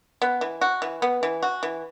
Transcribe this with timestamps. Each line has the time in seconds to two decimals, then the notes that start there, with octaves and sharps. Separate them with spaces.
0.22 B3
0.41 E3
0.61 F#4
0.82 E3
1.02 B3
1.23 E3
1.43 F#4
1.63 E3